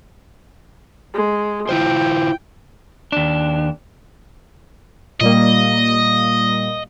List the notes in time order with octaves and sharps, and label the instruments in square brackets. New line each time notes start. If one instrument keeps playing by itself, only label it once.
[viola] G#3
[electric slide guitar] E4 F4 C5 [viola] G5
[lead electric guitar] D#2 D4
[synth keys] A#2 G3 A#3 [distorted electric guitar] D#5